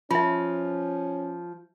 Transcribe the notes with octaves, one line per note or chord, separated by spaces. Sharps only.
F3 C#4 F4 E5